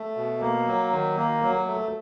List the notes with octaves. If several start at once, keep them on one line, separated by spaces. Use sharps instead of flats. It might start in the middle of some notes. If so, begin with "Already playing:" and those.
Already playing: A3
B2
A#3
F#3
D#3
A#3
F#3
A3